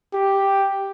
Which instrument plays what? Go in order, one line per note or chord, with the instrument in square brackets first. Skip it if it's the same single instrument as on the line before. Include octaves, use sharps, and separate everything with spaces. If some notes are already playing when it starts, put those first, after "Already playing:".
[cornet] G4